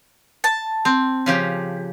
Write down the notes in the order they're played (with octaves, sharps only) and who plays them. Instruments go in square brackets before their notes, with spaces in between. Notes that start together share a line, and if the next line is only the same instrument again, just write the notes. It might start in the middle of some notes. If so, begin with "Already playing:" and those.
[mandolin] A5
[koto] C4
C#3 F3 G4